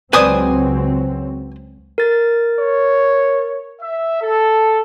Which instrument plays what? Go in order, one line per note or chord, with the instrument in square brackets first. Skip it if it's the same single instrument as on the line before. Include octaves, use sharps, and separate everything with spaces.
[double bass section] C#2 F#3 C4 [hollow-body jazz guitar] B4 C5 D5 [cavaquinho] G#5 D#6
[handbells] A#4 A6
[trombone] C#5
[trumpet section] E5
A4